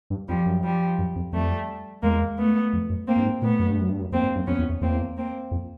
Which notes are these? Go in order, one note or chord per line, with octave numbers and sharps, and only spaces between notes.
G2
F2 F3 G3
F#2
F3 G3
F#2
F2
F2 G3 A3
E2 G#3 A#3
A3 B3
F2
F#2
A#3 C4
G2
G#2
A#2 A3 B3
F#2
G2
F#2
G2
F#2
F2 A#3 C4
G2
F#2
F2 B3 C#4
E2
E2
E2 A#3 C4
A#3 C4
F2